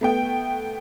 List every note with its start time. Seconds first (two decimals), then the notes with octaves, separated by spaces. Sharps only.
0.01 A3 B3 G5